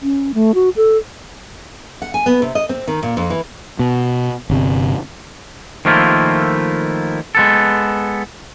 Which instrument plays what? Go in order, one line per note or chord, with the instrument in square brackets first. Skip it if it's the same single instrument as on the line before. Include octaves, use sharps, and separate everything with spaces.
[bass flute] C#4
A3
F#4
A4
[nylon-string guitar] F#5
G#5
B3
C3
D#5
C4
D#3
A#2
F2
E3
[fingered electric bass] B2
G1 C3
[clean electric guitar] D#3 F3 A3 A#3 E4 F4
G#3 B3 A4